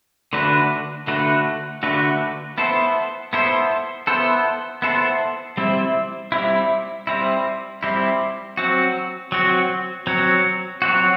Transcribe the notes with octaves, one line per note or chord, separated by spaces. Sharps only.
D3 A3 D4 F#4 B4
D3 A3 D4 F#4 B4
D3 A3 D4 F#4 B4
B3 E4 A4 C5
B3 E4 A4 C5
B3 E4 A4 C5
B3 E4 A4 C5
G3 C4 E4
G3 C4 E4
G3 C4 E4
G3 C4 E4
F#3 C4 F#4
F#3 C4 F#4
F#3 C4 F#4
F#3 C4 F#4